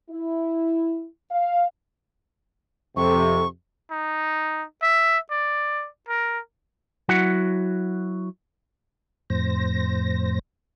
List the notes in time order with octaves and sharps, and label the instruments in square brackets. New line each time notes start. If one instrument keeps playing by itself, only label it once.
[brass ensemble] E4
F5
[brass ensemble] F2 C3 [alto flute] A4 [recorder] C#6
[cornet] D#4
E5
D5
A#4
[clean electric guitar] F#3 E4 F#4 F#5
[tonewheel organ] F2 A2 C5 A#6